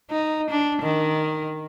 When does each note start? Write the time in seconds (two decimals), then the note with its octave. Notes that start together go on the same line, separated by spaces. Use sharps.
0.11 D#4
0.50 D4
0.82 D#3